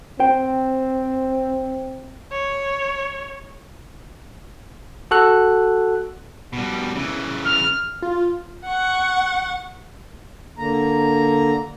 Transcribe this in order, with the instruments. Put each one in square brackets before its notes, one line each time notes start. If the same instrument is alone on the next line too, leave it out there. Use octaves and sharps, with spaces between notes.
[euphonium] C4 [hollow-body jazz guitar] C5 G5
[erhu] C#5
[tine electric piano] F#4 A4 F#6
[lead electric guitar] B2 G3
C#3 E3
[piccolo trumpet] F6
[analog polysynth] F4
[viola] F#5 C#6
[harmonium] D3 A#3 A#5